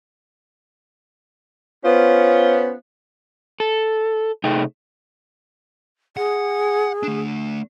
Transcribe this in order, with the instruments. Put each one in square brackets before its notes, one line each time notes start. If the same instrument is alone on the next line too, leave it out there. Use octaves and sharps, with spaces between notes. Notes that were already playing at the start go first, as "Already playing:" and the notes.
[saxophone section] B3 C#4 F4 C5
[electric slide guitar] A4
C3 A3 D#4 G#4 G5
[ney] G#4 [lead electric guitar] F#5
[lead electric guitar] A3 D4